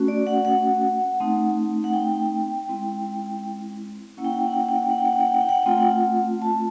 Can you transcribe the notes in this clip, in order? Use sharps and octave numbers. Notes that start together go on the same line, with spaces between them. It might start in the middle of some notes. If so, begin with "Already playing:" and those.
Already playing: A3 C#4 F#4
D5
F#5
F#5
A3 C4 D#4
F#5
G5
G#3 C4 E4
A#3 C#4 E4 F#5
G5
F#5
G5
F#5
G5
F#5
G5
F#5
G5
F#5
G5
F#5
G5
F#5
G5
F#5
G5
F#5
G5
F#5
A3 C4 F4 G5
F#5
A5